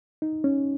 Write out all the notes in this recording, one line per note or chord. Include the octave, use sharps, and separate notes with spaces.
D#4
C#4